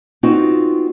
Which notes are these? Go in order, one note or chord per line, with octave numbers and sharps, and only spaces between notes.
B3 C4 D#4 F4 F#4